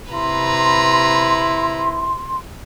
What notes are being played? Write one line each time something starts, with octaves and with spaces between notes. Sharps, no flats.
C3 E4 B4 A#5 C6